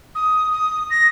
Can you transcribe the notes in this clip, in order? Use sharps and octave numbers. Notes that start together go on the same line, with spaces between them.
D#6
D#6
A#6